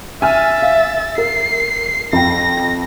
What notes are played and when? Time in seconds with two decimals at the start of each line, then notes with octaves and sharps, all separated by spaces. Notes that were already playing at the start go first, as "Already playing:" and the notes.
0.22 E5 G#5 F6 A6
0.62 F5
1.18 A#4 C7
2.13 F2 G5 A#6